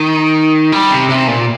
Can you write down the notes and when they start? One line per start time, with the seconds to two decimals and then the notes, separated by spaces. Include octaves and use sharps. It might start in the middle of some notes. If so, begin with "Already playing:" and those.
Already playing: D#3
0.72 G3
0.91 C3
1.09 C3
1.27 A#2